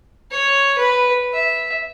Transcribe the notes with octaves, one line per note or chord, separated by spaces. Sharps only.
C#5
B4
E5